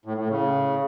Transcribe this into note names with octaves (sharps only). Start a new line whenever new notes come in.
A2
A2
C#3